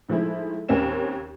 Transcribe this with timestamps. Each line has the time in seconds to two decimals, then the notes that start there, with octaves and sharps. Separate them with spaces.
0.09 D#3 F3 G#3 A3 E4
0.69 D#2 A#3 C4 C#4 E7